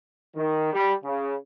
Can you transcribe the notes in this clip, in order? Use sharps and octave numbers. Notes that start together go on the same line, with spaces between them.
D#3
G3
C#3